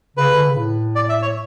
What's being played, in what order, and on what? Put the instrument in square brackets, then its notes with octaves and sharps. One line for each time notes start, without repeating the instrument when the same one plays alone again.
[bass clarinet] C#3 [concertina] B4
[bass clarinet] D3
C#3
A2
[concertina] D5
E5
C#5